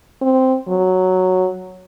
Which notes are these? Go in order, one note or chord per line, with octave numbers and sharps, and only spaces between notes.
C4
F#3